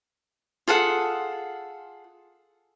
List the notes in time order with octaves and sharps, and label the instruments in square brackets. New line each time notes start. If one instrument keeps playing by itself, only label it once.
[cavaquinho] F4 G#4 A4 F#5